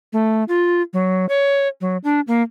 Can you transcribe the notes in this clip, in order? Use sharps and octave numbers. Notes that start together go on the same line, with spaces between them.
A3
F4
F#3
C#5
F#3
D4
A#3